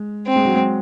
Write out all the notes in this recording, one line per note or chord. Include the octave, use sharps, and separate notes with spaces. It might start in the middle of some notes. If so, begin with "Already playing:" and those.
Already playing: G#3
C4
G#3
F#3
G#3